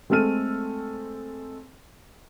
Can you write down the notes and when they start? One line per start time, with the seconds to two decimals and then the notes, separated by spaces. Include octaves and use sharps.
0.10 G#3 A3 C4 A4 F6 D#7